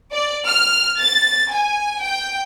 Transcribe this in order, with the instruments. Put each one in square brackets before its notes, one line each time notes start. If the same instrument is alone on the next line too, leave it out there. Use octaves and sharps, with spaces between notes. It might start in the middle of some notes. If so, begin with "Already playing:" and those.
[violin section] D5
F6
A6
G#5
G5